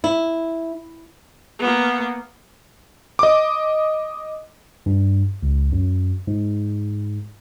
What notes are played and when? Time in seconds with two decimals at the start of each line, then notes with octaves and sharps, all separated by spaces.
0.04 E4
1.59 A#3 B3
3.19 D#5 D6
4.86 G2
5.43 C#2
5.72 F#2
6.27 G#2